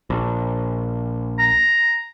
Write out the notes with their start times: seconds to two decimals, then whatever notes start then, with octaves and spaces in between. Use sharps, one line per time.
0.10 A#1
1.39 A#5